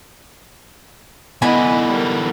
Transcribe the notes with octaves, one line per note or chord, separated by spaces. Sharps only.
D3 E3 B3 E4 D#5 F#5 G#5 B5
G3 A#4